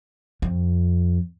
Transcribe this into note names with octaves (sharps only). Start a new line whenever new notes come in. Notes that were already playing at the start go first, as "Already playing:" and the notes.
F2